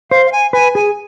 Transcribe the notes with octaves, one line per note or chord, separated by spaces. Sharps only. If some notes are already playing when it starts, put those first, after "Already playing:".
C5 F5
F5
G#5
B4 G#5
G#4 G#5